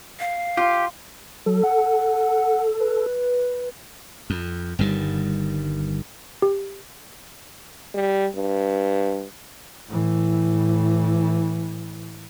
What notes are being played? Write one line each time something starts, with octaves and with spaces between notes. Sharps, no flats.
F5
F4 G4
F#3 A4
F#5
B4
F2
G1 G2 D#3 G3
G4
G3
G2
A2 E3